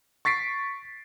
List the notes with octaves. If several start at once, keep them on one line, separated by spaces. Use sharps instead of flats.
C#6 A6 B6 C7 D7